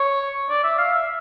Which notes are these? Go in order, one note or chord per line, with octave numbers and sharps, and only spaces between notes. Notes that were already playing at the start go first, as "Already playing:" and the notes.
Already playing: C#5
D5
E5
F5
E5